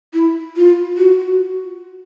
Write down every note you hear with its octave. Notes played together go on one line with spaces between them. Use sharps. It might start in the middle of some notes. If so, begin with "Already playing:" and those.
E4
F4
F#4